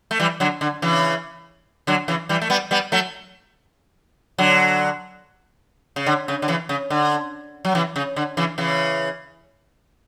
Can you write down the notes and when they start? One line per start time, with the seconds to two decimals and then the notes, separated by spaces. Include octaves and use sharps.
0.11 A3
0.20 E3 G3
0.40 D3 F#3
0.61 D3
0.82 C#3 E3
1.87 D3 F#3
2.08 C#3 E3
2.29 E3 G3
2.41 A3
2.50 G3 B3
2.71 G3 B3
2.92 F#3 A3
4.38 D3 F#3
5.96 C#3
6.06 D3
6.28 C#3
6.42 D3
6.48 C#3 E3
6.69 C#3
6.90 D3
7.65 F#3
7.75 C#3 E3
7.96 C#3
8.16 D3
8.37 C#3 E3
8.58 C#3 E3